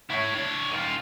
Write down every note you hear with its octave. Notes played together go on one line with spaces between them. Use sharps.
E4 C#5
D4 C#5
D#3 F4